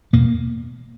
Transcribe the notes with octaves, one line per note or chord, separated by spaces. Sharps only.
E2 B2 A#3